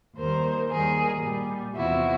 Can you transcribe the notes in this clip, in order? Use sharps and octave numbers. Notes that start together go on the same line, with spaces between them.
D#2 D#3 G3 A#4 C5
D#2 D#3 G3 G#4 A#4
A#2 G3
E2 C3 F3 E4 F#4